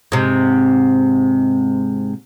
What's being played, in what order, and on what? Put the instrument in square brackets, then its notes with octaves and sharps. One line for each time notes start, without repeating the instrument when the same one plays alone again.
[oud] G#2 C3